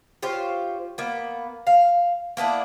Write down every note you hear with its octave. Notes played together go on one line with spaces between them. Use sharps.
F4 G4 C5 C#5
A#3 B3
F5
A#3 B3 D4 E4